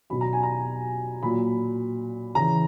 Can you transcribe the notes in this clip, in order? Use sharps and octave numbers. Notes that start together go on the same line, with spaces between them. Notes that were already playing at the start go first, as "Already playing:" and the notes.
B2 F#3 B5
A#5
G#5
A#5
A#2 F#3 B5
C#3 E3 A#5